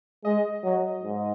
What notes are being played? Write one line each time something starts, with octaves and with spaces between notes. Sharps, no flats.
G#3 D#5
F#3
G#2